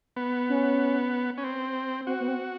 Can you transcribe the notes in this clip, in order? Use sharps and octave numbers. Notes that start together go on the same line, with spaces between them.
B3
C#4
C#4
C4
C4 F#4
B3
C4